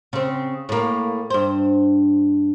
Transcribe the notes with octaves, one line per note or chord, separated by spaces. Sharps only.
C#3 C4
A2 A#3
G2 C5